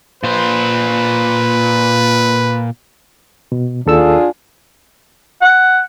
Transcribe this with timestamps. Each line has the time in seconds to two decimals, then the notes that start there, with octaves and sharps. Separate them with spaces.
0.24 A#2 B4 C5
3.52 B2
3.86 D#2 D4 F4 G#4 A4 E6
5.41 F#5